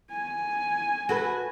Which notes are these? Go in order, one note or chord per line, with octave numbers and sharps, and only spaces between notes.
G#5
F#4 A4 B4